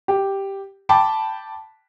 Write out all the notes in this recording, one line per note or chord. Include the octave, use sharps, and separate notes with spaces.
G4
G5 A5 B5 D6